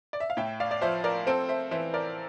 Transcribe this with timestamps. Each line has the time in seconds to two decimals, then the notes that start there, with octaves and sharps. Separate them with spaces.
0.13 D5
0.20 E5
0.30 F5
0.37 A2 E5 G5
0.60 D5 F5
0.71 D5
0.81 F3 C5 E5
1.04 A#4 D5
1.27 C4 A4 C5
1.49 C5 E5
1.71 E3 C5 E5
1.94 A#4 D5